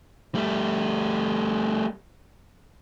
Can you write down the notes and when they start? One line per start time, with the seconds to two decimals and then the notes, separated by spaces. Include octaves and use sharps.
0.35 G3 A3